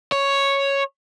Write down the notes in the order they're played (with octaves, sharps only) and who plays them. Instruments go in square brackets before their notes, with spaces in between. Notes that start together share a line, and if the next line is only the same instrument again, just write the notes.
[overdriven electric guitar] C#5